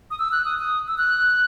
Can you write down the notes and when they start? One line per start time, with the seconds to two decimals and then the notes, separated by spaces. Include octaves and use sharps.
0.11 D#6
0.19 E6
0.32 F#6
0.45 D#6
0.59 D#6
0.88 E6
0.98 F#6